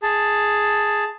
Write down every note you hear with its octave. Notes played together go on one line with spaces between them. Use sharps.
G#4 A5